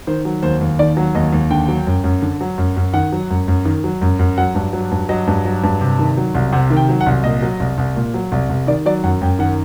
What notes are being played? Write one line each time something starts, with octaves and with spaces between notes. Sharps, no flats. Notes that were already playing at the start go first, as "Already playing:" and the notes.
D#3 C5
F#3
D#2 C5
D#2
D#3 D5
F#3
D#2 D#5
D#2
D3 G5
F#3
F#2
F#2
D3
F#3
F#2
F#2
D#3 F#5
F#3
F#2
F#2
D#3
F#3
F#2
F#2
F#3 F#5
G2
F#3
G2
F#3 D#5
G2
F#3
G2
C3
D#3
F#3
C2
C3 F#5
D#3
G5
F#3
F#5
C2
A#2 D#5
F#3
C2
C2
A#2
F#3
C2
C2
D#3 D5
F#3 D5
F#2 F#5
F#2 G5
D#3 F#5